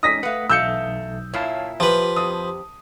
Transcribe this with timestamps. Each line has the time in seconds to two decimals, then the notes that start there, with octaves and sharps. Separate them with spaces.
0.03 G#3 C#4 D#4 D#6 A#6 B6
0.23 A3 B4 F5 F#5
0.49 B1 E2 A3 F5 E6 G6 C#7
1.34 A#2 E4 C#5 F5 A5
1.80 F3 G4 B4 C5
2.16 F2 D#6